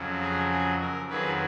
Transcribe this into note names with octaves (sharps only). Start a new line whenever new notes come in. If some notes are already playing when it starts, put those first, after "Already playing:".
Already playing: F2 C#3 F#3
G#4
G#4
A#4
F2 D#3 F#3 G#4 B4